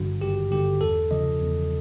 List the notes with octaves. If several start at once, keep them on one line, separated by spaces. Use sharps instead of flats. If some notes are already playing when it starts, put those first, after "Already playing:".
Already playing: G#1 G2 D3 F#4
G#1 G4
G2 D3 G4
E2 A4
C#3 F3 D#5
E2